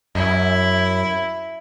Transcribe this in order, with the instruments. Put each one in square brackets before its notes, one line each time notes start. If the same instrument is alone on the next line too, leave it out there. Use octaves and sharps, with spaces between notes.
[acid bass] F#2 [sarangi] E4